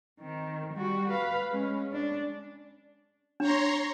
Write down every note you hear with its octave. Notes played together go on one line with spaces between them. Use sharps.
D#3 C4
G3 F#4
B4 F5
G#3 C#4
D4
D4 C#5 A#5 C6